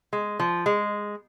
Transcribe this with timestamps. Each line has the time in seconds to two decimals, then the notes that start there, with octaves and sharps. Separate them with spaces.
0.13 G#3
0.40 F3
0.66 G#3